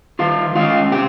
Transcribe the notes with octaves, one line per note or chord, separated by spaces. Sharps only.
D#3 F4 F5
G#3 C#4 F4 F5
C3 G4 G5